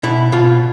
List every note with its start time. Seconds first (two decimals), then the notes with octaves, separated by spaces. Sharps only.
0.03 B2 E4
0.32 B2 F4